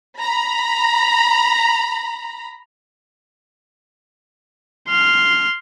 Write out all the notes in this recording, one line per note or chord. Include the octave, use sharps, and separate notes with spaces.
A#5 B5
C6 F6